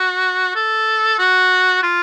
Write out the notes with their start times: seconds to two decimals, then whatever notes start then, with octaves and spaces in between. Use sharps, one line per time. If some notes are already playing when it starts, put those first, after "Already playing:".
Already playing: F#4
0.55 A4
1.19 F#4
1.83 F4